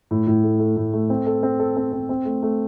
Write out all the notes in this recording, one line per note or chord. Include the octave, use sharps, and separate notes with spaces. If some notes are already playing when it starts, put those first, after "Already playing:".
A2
A2
A3
A3
A2
A3
C4
A4
C4
A4
C4
C4
C4
A3
A3